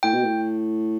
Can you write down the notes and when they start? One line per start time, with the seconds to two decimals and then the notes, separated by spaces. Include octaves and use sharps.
0.03 A2 G5
0.13 B2
0.23 A2